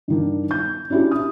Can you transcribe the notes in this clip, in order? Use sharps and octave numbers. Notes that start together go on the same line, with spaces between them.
G2 D#3 D4
G6
C#4 D4 E4 F#4 G4
D#6